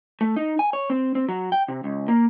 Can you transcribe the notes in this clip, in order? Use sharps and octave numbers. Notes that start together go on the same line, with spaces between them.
A3
D#4
G#5
C#5
C4
C4
F#3
G5
C3
C#2
A#3